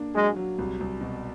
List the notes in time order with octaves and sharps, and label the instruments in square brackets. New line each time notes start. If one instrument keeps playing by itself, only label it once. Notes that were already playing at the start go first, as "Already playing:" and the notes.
Already playing: [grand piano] A#3 D4
[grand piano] F#3 [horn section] G#3
[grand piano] F#3
C2
C2
B2